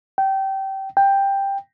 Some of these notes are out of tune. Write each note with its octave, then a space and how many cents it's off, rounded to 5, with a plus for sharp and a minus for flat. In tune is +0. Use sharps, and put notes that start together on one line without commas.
G5 -20
G5 +10